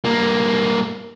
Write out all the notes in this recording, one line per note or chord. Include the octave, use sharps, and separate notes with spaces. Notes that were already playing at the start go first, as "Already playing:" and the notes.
G2 A#3